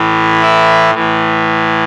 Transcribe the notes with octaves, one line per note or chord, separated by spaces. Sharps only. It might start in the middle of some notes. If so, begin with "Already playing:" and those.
Already playing: A2 E3
E4
A2 E3